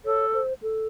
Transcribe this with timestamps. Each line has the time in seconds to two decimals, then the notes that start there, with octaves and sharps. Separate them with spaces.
0.05 A4 C#5
0.33 C5
0.62 A4